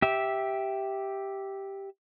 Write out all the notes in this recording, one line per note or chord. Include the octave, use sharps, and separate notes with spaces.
G4 E5